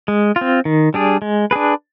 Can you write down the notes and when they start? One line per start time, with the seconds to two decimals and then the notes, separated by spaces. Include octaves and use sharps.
0.08 G#3
0.36 F4
0.41 C4
0.65 D#3
0.94 G3 D4 G#4
1.22 G#3
1.51 D4 G#4 B4